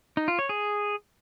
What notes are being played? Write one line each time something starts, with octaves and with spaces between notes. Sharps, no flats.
D#4
F4
C#5
G#4